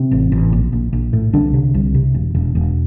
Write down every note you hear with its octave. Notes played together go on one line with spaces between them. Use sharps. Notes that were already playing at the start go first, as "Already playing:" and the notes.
Already playing: C3 C4
A1
A1
A#1
A#1
A#1
A2
C2 D3 D4
C3
C2
C3
E1
E1
E1